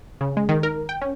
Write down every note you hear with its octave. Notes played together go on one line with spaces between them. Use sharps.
C#3
G#3
D#3
A#4
G5
C#4